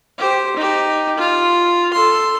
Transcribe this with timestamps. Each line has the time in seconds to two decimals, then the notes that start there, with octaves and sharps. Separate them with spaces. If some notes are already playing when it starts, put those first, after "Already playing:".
0.18 G4 C5
0.56 D#4 G4
1.18 F4
1.93 A4 C6